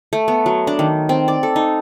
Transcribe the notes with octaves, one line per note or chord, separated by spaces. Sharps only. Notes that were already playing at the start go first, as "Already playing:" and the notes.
A3
B3
F#3
D4
D#3
C4
D5
A4
D#4